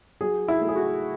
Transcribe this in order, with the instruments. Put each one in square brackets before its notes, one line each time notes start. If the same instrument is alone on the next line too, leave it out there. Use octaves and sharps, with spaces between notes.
[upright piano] F#3 G#4
E4
A3
G#4
F#4